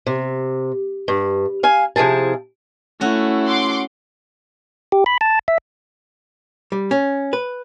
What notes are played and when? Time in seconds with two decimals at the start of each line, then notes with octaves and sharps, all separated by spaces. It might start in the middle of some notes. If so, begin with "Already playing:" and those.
0.07 C3
1.08 G2
1.63 F5 G#5
1.96 C3 F3 E4 G#4 A5
3.01 A3 C#4 E4 F#4
3.47 F#5 C6 D6
4.92 G4
5.06 B5
5.21 A5
5.48 E5
6.72 G3
6.91 C#4
7.33 B4